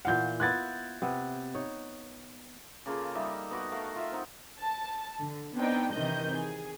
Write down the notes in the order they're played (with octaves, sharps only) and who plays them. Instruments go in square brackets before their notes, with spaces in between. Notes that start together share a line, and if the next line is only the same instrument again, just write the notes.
[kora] A#2 E3 F5 [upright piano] F#5 G6
[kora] B3 E4 F4 [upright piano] F#6 G#6 A6
[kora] C3 B3
D#4 C#5
[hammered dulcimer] C#3 A#3 F4 A4
G3 D#4 E5
B3 F#4 G4
A3 F#4 A#4 F5
F4 E5
C4 D#4 F#5
[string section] A5
D3
B3 C4 D4 D#4 G5
C3 D#3 E3 D#5 G6
G#4